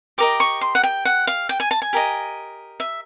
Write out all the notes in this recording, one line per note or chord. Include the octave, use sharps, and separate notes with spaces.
G4 A#4 D#5 D6
C#6
C6
F#5
G5
F#5
F5
G5
G#5
A5
G#5
G4 A#4 D#5
E5